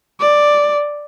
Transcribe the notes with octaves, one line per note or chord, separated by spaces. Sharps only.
D5